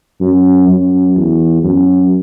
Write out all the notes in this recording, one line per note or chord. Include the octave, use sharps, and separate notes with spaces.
F#2
F#2
E2
F#2